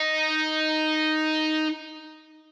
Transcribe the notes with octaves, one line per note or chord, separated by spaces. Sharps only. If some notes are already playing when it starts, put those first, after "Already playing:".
Already playing: D#4